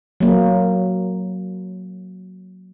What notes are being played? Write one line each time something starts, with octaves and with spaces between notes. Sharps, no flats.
F#3 A#3